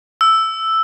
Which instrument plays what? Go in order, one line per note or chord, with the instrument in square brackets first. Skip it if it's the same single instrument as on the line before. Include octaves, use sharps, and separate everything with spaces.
[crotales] E6